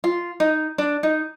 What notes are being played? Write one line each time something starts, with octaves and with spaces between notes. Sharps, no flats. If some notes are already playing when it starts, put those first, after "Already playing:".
F4
D#4
D4
D#4